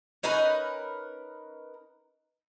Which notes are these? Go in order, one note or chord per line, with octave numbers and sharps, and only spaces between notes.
C#4 D#4 A#4 B4